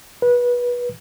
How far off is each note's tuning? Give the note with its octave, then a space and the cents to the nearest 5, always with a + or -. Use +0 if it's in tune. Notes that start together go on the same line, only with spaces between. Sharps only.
B4 -20